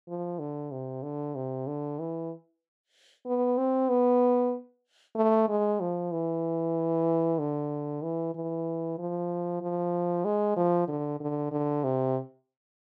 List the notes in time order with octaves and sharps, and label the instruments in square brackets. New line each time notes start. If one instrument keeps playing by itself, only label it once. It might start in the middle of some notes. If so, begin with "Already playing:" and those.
[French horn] F3
D3
C3
D3
C3
D3
E3
B3
C4
B3
A3
G#3
F3
E3
D3
E3
E3
F3
F3
G#3
F3
D3
D3
D3
C3